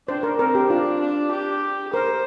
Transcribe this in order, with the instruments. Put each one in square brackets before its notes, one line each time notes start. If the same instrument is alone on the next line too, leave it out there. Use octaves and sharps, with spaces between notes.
[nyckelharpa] D4 [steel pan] C5
[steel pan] A#4
[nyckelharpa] C4 [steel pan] A#4
[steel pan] G4
[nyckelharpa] D4 [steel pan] F4
[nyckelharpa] D4
G4
[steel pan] A#4 [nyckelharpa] C5